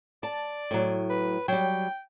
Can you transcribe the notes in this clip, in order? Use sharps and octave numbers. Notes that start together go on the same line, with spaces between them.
D5 A5
A2 F#3
B4
F#3 G3 G5